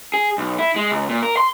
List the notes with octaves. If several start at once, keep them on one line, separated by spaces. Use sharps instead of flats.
G#4
B1
E4
G#3
C#2
A#2
A#4
C6